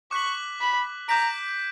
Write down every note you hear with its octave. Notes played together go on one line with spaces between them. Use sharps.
C#6 D6 F#6 B6 F#7
B5
A#5 D6 G6 B6 D7